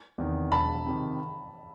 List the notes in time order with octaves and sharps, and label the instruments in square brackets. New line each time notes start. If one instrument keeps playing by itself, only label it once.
[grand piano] E2 C3 D#3
[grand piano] E1 [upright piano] A5 B5
[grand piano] C3 D#3